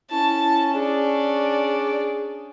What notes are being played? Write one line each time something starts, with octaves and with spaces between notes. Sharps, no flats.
C#4 E4 A5
D4 G#4 D5